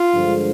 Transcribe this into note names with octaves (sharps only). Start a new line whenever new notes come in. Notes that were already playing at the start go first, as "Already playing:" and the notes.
Already playing: F4
G2 D3 F3 G#3